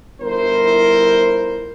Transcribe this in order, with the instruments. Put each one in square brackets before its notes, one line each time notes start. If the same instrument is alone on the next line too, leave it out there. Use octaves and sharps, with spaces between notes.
[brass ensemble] G1 E4 A#4 C5